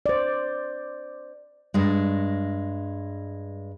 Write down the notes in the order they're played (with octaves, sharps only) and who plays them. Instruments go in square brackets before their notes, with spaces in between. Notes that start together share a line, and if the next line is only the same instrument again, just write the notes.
[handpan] C5 D5
[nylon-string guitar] G2 G#3